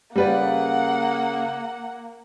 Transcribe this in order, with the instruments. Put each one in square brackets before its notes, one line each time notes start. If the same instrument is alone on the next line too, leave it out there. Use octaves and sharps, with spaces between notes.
[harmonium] C#3 [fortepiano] G3 B4 D5 [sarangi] A#3 [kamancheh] F#5